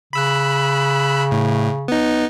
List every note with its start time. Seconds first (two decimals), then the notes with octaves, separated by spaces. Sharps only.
0.13 C#3 B5 E6 F#6
1.31 A2
1.88 B3 D#4